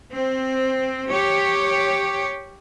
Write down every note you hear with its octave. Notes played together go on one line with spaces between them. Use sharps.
C4
G4 C#5